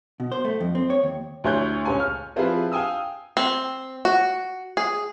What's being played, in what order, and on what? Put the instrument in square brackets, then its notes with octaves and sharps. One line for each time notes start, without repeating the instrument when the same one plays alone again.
[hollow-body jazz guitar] B2
C5
A3
F2
C4
C#5
D#2
[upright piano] D2 E4 C#5 C6 F#6 G6
C#2 C#5 G#5
F6
F3 C4 E4 F4 G#4 B4
F5 G5 G#5 D#6 E6
[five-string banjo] C4
F#4
G#4